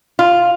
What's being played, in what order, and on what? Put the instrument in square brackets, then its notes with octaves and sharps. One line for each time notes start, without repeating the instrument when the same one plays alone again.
[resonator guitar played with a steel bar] F4